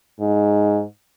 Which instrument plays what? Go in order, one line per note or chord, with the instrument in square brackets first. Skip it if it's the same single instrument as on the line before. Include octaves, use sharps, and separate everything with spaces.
[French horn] G#2